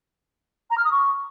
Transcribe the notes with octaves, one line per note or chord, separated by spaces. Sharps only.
A#5
F6
D#6
C#6